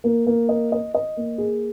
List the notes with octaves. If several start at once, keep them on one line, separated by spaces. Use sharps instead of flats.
A#3
A#3
D#5
D#5
D#5
A#3
G#4